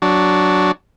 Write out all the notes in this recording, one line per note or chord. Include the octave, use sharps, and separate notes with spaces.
F#3 D4